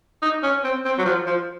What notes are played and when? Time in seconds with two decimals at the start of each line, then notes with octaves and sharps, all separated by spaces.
0.22 D#4
0.43 C#4
0.64 C4
0.85 C4
0.99 F#3
1.05 F3
1.27 F3